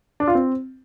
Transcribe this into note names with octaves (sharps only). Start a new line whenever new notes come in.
D4
F4
C4